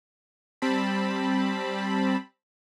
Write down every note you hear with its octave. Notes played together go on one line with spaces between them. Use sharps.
G3 C4 A5 B5